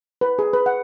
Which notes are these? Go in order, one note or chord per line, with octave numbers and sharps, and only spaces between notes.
B4
G#4
B4
F#5